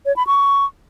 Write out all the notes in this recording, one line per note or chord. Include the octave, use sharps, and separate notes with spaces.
C#5
B5
C#6